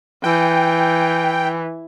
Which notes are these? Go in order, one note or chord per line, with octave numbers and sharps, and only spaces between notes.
E3 G5